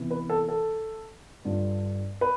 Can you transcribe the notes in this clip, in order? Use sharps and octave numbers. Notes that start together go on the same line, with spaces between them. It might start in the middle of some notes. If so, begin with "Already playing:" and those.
Already playing: C3 E3 B3
B4
A4
A4
G2 D3 G3 D4 F4
B4